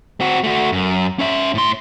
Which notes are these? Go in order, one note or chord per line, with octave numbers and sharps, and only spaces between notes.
C4 F#4
A3 F#4
F#2
C#4 E5
A2 C6